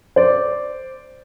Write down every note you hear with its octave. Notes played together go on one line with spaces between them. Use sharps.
C5 D5